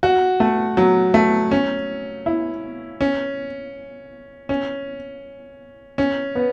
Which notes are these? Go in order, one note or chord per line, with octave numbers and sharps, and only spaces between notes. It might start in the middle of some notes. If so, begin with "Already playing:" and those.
F#4
A3
F#3
A3
C#4
E4
C#4
C#4
C#4
B3